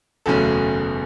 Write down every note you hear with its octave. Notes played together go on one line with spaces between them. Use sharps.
F#1 E2 B2 A3 C#4 A4